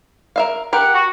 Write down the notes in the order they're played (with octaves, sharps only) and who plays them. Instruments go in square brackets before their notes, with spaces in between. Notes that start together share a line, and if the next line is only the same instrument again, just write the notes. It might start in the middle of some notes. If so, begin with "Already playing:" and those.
[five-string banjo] A#4 E5 F5
[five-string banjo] G4 A#4 [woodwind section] F#5
[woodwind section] F#4